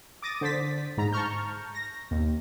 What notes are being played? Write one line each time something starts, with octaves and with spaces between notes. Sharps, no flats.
D6 D#6 A6 A#6 D#7
D3 C5 A6 B6
G#2 A#5
A5 A#5 C#6 F6 G6
A#6
D#2